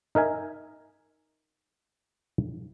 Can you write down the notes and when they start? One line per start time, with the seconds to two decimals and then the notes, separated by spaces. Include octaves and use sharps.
0.15 D#4 A#4 E5 G#5